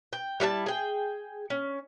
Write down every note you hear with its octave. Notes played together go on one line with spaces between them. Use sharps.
G5
G3 E4 F5 A5
G#4 G5
C#4